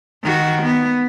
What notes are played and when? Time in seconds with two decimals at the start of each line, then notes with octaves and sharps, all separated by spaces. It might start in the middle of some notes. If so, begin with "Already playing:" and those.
0.23 D#3 F#4
0.63 B3